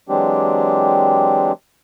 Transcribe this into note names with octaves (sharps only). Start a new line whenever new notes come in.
E3 F#3 G#3 C4 D4 G4